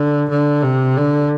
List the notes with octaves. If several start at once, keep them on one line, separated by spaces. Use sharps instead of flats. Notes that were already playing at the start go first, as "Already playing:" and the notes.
Already playing: D3
D3
C3
D3